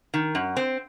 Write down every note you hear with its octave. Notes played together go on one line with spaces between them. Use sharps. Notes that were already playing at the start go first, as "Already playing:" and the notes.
D#3
F#2
C4